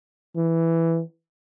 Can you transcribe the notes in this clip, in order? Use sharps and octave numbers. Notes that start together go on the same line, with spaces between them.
E3